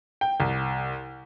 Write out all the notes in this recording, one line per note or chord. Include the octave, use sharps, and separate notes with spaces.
G5
C2